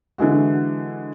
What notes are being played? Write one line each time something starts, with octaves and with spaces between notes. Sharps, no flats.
D3 E3 G#3 F#4